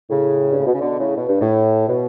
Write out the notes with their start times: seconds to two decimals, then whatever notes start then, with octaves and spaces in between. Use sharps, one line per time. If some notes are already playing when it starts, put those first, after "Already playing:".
0.10 A2 C#3
0.52 G2
0.59 A2
0.66 B2
0.74 C#3
0.81 B2 D3
0.99 A2 C#3
1.17 B2
1.28 G2
1.40 A2
1.88 B2